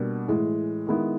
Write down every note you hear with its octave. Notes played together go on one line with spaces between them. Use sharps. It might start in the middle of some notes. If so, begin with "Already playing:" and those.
Already playing: B2 G3 A#3 D4
A2 E3 G#3
D#3 G#3 B3 E4